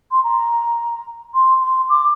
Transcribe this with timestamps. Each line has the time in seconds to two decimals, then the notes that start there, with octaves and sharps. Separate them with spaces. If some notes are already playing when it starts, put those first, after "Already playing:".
0.11 C6
0.23 A#5
1.34 C6
1.61 C6
1.89 D6